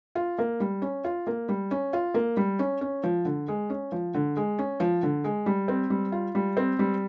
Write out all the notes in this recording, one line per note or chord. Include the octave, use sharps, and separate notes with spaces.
F4
A#3
G3
C#4
F4
A#3
G3
C#4
F4
A#3
G3
C#4
C#4
F3
D3
G#3
C#4
F3
D3
G#3
C#4
F3
D3
G#3
G3
C4
G3
F4
G3
C4
G3